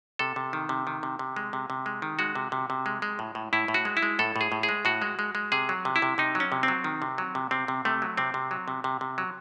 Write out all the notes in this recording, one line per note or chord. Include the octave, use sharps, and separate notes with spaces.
C3 A4
C3
D#3
C3
D#3
C3
C3
G#3
C3
C3
G#3
D#3
G#3 F#4
C3
C3
C3
G#3
G#3
A2
A2
A2 E4
A2
F#4
G#3
E4
G#3
A2 A4
A2
G#4
A2
G#4
G#3
A2 F#4
G#3
G#3
G#3
C3 G#4
F#3
C3
E4
C3
C3 D#4
F#3
C#4
C3
C4
F#3
D#3
C3
F#3
C3
C3 C4
C3
C3 A3
F#3
C3 C4
C3
F#3
C3
C3
C3
F#3